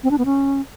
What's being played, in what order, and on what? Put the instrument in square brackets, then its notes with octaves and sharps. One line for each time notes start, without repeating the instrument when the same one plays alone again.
[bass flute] C4
D4
B3
C#4